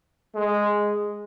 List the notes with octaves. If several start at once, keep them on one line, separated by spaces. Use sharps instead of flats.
G#3